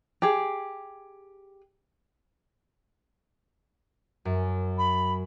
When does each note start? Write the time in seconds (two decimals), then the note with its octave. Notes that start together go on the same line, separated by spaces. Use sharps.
0.22 G4 G#4
4.25 F#2
4.78 B5